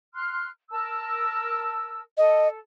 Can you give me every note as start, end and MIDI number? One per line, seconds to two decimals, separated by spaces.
0.14 0.48 84
0.14 0.48 89
0.14 0.48 90
0.70 2.00 70
0.70 2.00 81
0.70 2.00 88
2.17 2.57 69
2.17 2.48 75